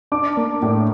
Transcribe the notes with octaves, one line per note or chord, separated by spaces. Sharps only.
D4 D6
A#3
A2